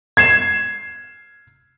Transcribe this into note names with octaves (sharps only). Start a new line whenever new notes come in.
G#6 C7 E7